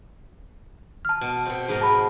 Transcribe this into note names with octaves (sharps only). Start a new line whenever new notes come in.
A5 F6
B2
B2 C4
G#2 B3 A#4
A5 B5